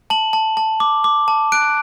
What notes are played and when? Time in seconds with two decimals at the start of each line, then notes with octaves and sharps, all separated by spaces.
0.10 A5 F#7
0.33 A5
0.57 A5
0.80 D6
1.04 D6
1.28 A5
1.52 F#6 D7